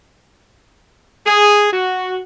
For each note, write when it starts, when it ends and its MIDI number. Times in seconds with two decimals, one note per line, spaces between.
1.27 1.72 68
1.73 2.20 66